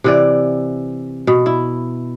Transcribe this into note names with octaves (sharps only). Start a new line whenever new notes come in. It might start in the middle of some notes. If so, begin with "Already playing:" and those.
C3 E3 D5
B2
E4